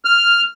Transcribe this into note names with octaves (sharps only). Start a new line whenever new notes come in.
F6